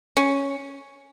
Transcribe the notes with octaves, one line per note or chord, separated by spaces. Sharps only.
C#4